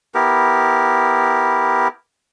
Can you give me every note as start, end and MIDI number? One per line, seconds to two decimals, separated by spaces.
0.15 1.88 59
0.15 1.88 64
0.15 1.88 67
0.15 1.88 70